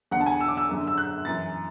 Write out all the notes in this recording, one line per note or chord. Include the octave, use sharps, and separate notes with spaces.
E2 D3 F#5
A5
G#5
E6
D6
E6
F#2 D3
E6
F#6
F#2 E3 A6